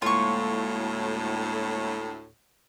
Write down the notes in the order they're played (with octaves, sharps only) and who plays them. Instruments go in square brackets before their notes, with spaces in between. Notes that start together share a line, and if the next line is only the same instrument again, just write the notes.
[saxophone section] D2 A2 [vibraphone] G#3 A#3 [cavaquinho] F4 C#6